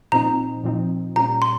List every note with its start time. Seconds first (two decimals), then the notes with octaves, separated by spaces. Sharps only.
0.12 A#2 F3 C4 D#4 A#5
0.64 A#2 F3 C4 D#4
1.16 A#2 G3 C#4 A#5
1.42 C6